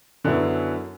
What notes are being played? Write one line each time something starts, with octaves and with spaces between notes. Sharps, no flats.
F#2 D3 F#3 B3 E4